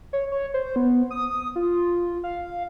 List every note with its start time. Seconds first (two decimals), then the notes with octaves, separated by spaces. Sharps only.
0.13 C#5
0.32 C#5
0.54 C5
0.76 B3
1.11 D#6
1.56 F4
2.24 F5